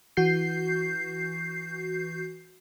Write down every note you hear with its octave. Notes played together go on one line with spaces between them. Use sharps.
E3 F#4 G6 C7